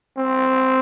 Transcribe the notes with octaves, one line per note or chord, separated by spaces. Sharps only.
C4